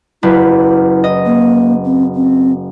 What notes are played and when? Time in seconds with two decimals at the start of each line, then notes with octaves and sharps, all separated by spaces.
0.23 F#1 E4 B4
1.04 D#5
1.26 A#3
1.85 C4
2.15 C4